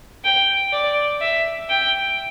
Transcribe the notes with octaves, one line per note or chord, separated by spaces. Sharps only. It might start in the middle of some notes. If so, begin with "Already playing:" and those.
G5
D5
E5
G5